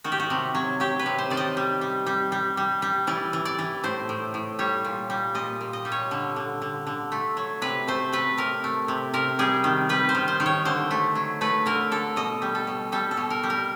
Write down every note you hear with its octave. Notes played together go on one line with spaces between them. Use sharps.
D#3 F#4
G4
F#4
C3
F#3
F#3 G4
B4
C3
C5
D#3 D5
D#5
G3
G3
G3
G3
G3
G3
E3 D5
E3
D5
E3
A2 C5
A2
A2
G3 C#5
A#2
G3
A#2 D#5
A#2
D#5
G3
C#5
D3
D3
D3
D3
A3
F#3
C3 B4
A3 C5
A3 B4
C3 A#4
A3
C3
C3 A#4
G3 G#4
D#3
G3 B4
C5
D#3
C5
D#3
C#5
D3 C5
A3
F#3
A3 B4
D3 A#4
D3 A4
B2 D#5
G3
A4
B2
G3 A4
A4
B2
A#4
G3
A#4